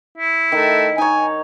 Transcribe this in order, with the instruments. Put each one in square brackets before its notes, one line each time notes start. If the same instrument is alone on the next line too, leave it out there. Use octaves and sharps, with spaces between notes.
[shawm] E4
[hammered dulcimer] D#3 [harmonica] A3
[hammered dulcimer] D#4 C#5 [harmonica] G#5